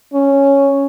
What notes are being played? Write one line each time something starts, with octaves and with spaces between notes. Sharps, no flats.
C#4